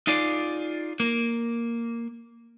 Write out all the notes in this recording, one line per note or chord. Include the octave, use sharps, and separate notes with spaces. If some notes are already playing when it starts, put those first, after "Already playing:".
D#4 F4 G#4 D5
A#3